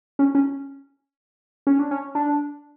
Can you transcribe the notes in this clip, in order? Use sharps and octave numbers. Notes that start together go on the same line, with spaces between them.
C#4
C#4
C#4
D4
C#4
D4